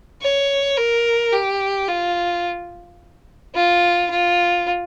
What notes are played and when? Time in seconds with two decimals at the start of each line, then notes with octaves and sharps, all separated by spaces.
0.22 C#5
0.77 A#4
1.33 G4
1.88 F4
3.55 F4
4.10 F4